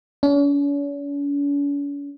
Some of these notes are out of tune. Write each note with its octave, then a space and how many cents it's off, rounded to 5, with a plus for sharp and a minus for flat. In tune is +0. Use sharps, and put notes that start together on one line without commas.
C#4 +45